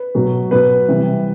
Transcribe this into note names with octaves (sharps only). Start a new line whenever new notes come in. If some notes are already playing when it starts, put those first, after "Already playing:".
Already playing: B4
B2 F#3
B2 F#3 B4
C3 E3 G3